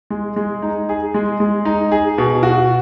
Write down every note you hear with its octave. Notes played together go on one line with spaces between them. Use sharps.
G#3
G#3
D#4
G#4
G#3
G#3
D#4
G#4
B2
F#4